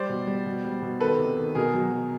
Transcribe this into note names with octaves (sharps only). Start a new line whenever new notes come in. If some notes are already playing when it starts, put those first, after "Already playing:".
Already playing: G3 C5 D5
B2
G3
B2
G3
B2
D#3 A4 B4
C3
D#3
B2 G#4 A#4
F#3
F#3